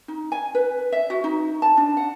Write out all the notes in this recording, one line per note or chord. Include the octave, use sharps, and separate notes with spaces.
D#4
G#5
B4
E5
F#4
D#4
A5
D4
F#5